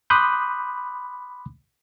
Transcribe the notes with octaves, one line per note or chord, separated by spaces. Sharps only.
B5 C6 D6 D#6 F#6 G6